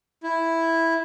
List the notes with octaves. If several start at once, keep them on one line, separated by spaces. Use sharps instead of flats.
E4